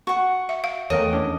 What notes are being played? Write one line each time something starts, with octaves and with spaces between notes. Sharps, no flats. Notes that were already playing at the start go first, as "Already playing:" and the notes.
F#4 F#5 C#6
E5
F5
E2 A3 A4 A#4 C#5 D#5 G5
C#4 D4 E4